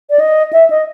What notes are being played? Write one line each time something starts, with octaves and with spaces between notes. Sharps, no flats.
D5
D#5
E5
D#5